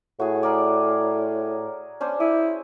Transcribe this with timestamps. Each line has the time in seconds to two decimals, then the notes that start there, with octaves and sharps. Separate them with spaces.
0.20 A2 F#4 G#4
0.43 G#4 A#4 D5
2.01 C#4 D4 C5
2.20 E4 D#6